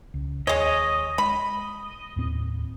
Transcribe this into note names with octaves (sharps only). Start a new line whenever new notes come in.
C#2
D#2 G#3 C#5 D#5
G#3 B5
D#2 A2 C4